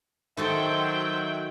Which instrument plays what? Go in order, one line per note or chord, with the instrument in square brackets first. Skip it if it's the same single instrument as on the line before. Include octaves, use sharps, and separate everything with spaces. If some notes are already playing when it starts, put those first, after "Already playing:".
[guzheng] D#3 F#4 A4 [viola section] F#3 G5 [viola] C5 [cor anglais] E5